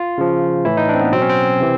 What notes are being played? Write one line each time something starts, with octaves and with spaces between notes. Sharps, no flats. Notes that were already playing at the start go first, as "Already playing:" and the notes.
Already playing: F4
C#3 F3
A2 E3 E4
D#4
D4
C4
B3
B2 F#3 C4
C#4
C4
C3 E3